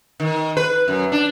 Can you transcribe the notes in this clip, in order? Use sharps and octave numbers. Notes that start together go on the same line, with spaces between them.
D#3
B4
F#2
D4